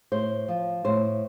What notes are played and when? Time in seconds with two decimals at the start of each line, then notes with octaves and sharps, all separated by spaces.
0.12 A2 C5
0.48 F3
0.85 A2 C5